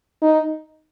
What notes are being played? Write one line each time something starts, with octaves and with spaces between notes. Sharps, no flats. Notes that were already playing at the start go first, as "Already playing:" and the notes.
D#4